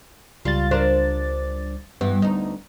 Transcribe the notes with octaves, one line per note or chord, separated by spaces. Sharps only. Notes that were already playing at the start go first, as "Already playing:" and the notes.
C#2 G3 F4 A6
D4 A#4 C5
G2 E3 B3
D2 D#4